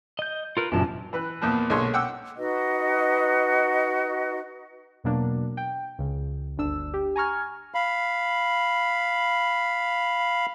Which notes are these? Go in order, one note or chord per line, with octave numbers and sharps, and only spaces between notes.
D#5 G6
F4 A#4 B4
F#1 F#2 A#2 G4 A5
E3 B4 F#6
E2 A#2 F3
B1 A#2 D3 G#3 C#5 C6
F#5 G5 D6 E6
D#4 F#4 B4 D#5
E2 B2 F#3 A#3 D4
G5
C#2 C#3
G1 D2 D4 E6
G4
G#5 A#5 C#6 F6 G#6
F5 B5